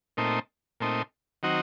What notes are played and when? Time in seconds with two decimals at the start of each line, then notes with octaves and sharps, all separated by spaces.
0.17 A#2 A3 C4 D#4
0.80 A#2 A3 C4 D#4
1.43 D#3 F#3 C4 D#4 F#4